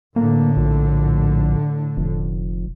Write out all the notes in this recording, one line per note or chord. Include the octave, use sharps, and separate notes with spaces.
A2 D3 A#3
A#1
F1